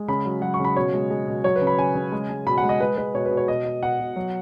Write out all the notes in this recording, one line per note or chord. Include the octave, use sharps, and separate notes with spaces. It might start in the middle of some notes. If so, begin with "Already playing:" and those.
Already playing: G#3
C#3 B5
F#3
F#3 F#5
C#6
C#3
B5
B2 C#5
G#3
G#3
B2
F#3 C#5
B4
C#3
B5
C#3 G#5
C#3
G#3
G#3
B2 B5
F#5
G#3
D#5
G#3 B4
G#3 B4
B2 C#5
B4
B2
C#5
B2 D#5
B2
B2 F#5
B2
F#3